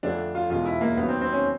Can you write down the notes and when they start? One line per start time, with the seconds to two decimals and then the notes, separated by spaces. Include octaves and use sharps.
0.03 F2 D3 F3 A3 D4
0.35 F4
0.50 E2 B2 G#3 F4
0.65 E4
0.81 A#3
0.97 D#2 D#3 F#3 B3
1.08 C4
1.21 C4
1.33 C#4